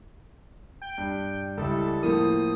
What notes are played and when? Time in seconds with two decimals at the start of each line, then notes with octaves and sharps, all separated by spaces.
0.82 G5
0.98 G2
1.57 C#2 G3 E4 A4
2.03 A2 F3 A#3 D#6